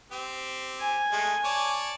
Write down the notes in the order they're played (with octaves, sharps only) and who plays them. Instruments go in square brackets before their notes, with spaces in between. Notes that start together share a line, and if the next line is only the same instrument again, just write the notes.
[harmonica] C4 G4
[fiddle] G#5
[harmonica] G#3 A3
C#5 D5 A5